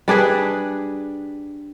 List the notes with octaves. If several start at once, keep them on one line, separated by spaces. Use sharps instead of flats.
G3 D4 G#4 B4